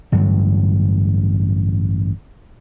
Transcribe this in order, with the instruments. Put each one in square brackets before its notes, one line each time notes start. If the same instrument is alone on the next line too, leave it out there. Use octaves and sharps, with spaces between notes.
[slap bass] A1 G2 D3 F#3